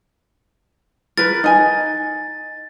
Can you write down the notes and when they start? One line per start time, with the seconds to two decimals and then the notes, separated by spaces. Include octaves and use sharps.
1.18 A#4 B4 A6
1.44 D#4 G#5